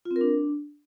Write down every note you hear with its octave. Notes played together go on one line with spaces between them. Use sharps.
F4
C4
A#4
D4